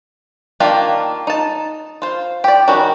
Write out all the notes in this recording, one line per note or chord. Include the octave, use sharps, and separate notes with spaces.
D#3 A#3 D4 F4 G4
D#4 A5
F4 C5
G4 D5
D#3 G3 C#4 F#4